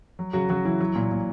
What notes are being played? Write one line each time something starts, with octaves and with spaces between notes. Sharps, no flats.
F#3
C#3 F#3 F#4
C#3 F#3 F#4
E3 F#3 E4
F#3
A#2
A#2